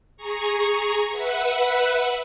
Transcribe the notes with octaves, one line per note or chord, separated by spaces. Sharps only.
G#4 A#5 C#6
B4 E5 F#5